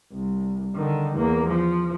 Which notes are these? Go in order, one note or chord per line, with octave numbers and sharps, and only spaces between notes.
C2
D3 D#3
E2 A#3
F3